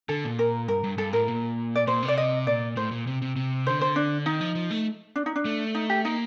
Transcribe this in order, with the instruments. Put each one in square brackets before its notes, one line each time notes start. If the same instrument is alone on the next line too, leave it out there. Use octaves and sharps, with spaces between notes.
[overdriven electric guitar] D3 [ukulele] A4
[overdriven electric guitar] A#2
[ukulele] A#4
[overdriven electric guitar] G2 [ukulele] A#4
[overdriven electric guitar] G2
[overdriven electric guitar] G2 [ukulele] A4
[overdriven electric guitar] A2 [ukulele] A#4
[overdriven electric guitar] A#2
[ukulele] D5
[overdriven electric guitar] A#2 [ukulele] C5
[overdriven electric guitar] C3
[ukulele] D5
D#5
[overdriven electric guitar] A#2 [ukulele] D5
[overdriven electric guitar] A2 [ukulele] C5
[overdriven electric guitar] A#2
C3
C3
C3
[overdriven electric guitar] D3 [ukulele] C5
[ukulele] C5
D4
[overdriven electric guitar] D#3 [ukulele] D#4
[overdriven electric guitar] F3
F3
A3
[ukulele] D4
D#4
D4
[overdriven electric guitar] A3
[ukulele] D#4
G4
[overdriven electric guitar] A#3 [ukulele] D#4